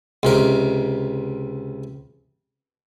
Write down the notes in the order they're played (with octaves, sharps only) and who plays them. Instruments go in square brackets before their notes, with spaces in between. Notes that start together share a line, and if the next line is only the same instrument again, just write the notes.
[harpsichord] C#2 C3 A#4